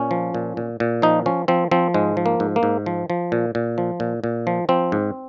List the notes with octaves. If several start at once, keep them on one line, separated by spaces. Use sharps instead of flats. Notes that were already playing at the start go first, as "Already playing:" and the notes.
Already playing: A#2 C#4
F3
A#2
A#2
A#2
F3 D#4
F3 C#4
F3 C4
F3 C4
G#2 G#3
F3
A#3
G#2
A#3
G#2
F3
F3
A#2
A#2
F3
A#2
A#2
F3
F3 C4
G#2